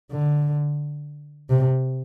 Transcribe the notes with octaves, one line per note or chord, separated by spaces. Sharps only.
D3
C3